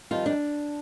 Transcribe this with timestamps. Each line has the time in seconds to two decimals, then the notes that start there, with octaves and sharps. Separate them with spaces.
0.11 F2 D#3 G3 F4
0.26 D4